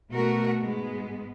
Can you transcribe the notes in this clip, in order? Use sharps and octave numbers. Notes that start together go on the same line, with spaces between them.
B2 A3 F#4 A#4
G#2 G#3 B3